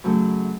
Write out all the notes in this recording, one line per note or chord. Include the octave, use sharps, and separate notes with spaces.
F#2 C#3 F#3 A3